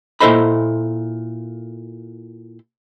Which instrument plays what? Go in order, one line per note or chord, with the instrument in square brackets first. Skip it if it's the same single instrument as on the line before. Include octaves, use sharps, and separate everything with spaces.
[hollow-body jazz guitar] A#2 E4 A4 C5 D#5 B5